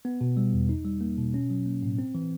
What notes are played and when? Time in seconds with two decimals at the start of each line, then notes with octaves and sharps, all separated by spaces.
0.05 B3
0.21 B2
0.37 G3
0.53 E2
0.69 D#4
0.85 G3
1.01 A#3
1.17 B2
1.34 C#4
1.50 F#3
1.66 A#3
1.83 A2
1.99 C4
2.15 E3